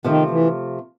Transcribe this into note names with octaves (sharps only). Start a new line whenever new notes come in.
C3 D#3 F3 A3
E3